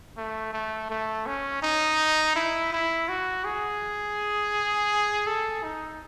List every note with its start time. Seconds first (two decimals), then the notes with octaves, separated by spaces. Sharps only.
0.17 A3
0.53 A3
0.90 A3
1.26 C#4
1.62 D#4
2.35 E4
2.72 E4
3.08 F#4
3.45 G#4
5.27 A4
5.63 D#4